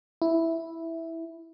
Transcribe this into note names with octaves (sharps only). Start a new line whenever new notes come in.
E4